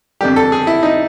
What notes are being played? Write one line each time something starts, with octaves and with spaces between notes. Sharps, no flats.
F2 D3 G3 G4
A4
G#4
E4
D#4